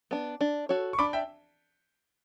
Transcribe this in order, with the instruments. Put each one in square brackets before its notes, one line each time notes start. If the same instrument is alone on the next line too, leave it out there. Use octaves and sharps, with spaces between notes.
[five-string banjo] B3 D4
D4
F#4 A4 C#5
[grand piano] C#6
[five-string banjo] D4 [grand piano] B5 D6
[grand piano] E5 G5